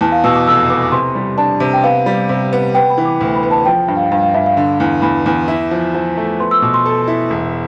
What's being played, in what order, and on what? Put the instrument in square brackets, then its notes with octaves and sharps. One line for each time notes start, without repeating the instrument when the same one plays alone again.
[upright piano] E2 [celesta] A5
[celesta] F5
[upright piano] B2 [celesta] E6
[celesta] D6
[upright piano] F1 [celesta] E6
[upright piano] B3 [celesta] D6
[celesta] D6
[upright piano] C3 [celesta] C6
[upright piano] G3
[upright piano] D4 [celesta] A5
[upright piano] C3
[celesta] G5
[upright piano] B3 [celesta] F5
[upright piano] G3
C3
B3
[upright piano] B3 [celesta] G5
[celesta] B5
[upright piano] E3
[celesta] D6
[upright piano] D2
[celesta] B5
[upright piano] B3
[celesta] A5
[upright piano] F3 [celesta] G5
[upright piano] G2
[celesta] F5
[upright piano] G2 [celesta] F5
[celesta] F5
[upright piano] G2 [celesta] E5
[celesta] F5
[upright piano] D3
E2
[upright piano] E2 [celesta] B5
[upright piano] E2
E4
F3
F3
A3
[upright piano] B3 [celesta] C6
[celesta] E6
[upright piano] B2 [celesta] D6
[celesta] C6
[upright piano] A4
E4
E1